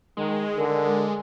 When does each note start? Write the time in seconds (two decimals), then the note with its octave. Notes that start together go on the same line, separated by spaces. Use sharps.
0.17 D#3 G#3
0.58 D3 A#4